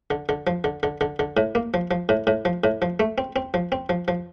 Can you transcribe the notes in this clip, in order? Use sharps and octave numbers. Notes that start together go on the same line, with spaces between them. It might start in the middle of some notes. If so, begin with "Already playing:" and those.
D3
D3
F3
D3
D3
D3
D3
A2
A#3
F3
F3
A2
A2
F3
A2
F3
A3
C4
C4
F3
C4
F3
F3